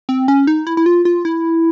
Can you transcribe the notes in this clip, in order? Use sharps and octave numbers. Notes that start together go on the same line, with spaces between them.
C4
C#4
D#4
E4
E4
F4
F4
E4